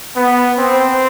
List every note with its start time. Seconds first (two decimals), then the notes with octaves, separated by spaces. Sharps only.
0.16 B3
0.59 C4